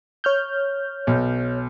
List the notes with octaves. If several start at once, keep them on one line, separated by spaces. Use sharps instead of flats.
C#5 F6 G6
B1